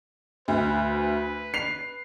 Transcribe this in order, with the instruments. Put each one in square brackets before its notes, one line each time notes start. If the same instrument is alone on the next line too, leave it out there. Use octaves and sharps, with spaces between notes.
[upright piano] D2 [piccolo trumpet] B4
[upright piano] C7 F7